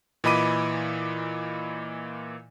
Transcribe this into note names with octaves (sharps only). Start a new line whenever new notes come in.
A#2 E3 D#5 B5 D6 D#7